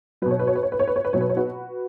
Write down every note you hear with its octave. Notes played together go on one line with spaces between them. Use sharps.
B2 F#3 B4 C#5
B4
C#5
B4
C#5
B4
C#5
B4
C#5
B4
B2 F#3 C#5
B4
C#5
F#4 B4